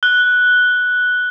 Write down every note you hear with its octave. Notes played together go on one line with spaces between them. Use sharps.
F#6 G7